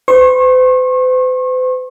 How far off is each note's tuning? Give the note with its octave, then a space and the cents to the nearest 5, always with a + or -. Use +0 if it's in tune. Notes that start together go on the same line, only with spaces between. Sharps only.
C5 -45 C#6 -40